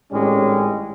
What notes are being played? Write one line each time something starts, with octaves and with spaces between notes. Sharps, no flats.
G#1 A2 G3 G#3 C#4